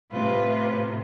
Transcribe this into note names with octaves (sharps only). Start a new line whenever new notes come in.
A2 C3 F4 B4